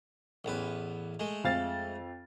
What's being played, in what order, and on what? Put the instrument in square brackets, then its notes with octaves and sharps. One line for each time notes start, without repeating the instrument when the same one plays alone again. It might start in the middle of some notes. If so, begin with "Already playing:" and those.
[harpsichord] A1 E2 B4
G#3 A3
[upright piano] F2 F5 A6